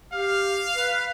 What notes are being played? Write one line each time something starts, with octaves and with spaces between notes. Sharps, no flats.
G4 F5 F6
B4